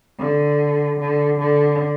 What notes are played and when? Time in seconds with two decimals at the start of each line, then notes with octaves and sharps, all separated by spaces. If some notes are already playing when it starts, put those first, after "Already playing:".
0.19 D3
1.00 D3
1.41 D3